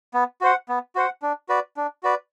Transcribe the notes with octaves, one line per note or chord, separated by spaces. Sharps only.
B3
F#4 C5 F#5
B3
F#4 C5 F#5
D4
F#4 B4 D5
D4
F#4 B4 D5